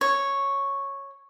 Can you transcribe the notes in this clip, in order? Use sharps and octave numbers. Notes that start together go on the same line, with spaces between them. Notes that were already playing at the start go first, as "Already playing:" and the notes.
C#5